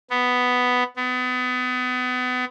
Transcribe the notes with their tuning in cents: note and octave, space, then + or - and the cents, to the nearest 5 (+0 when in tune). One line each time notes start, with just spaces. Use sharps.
B3 +5
B3 +30